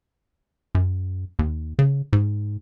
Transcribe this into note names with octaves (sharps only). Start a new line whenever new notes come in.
F#2
D#2
C#3
G#2